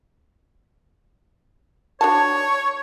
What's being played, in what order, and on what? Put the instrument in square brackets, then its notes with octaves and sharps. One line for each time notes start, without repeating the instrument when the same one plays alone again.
[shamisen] D4 F#4 A5 [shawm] C#5